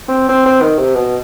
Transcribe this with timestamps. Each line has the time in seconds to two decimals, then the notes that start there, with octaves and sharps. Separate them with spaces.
0.08 C4
0.29 C4
0.46 C4
0.62 D#3
0.78 C3
0.95 B2